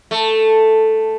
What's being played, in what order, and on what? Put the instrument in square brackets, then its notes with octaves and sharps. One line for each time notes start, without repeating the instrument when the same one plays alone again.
[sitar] A3